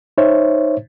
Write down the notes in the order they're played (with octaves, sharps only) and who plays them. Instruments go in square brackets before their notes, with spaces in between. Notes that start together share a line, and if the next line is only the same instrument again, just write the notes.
[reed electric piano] D#4 C5 C#5 E5